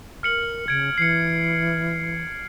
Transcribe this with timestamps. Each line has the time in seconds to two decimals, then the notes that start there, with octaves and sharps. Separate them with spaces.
0.23 A#4 F6 C#7 F#7
0.68 C#3 G#6 D7
0.98 E3 C7 C#7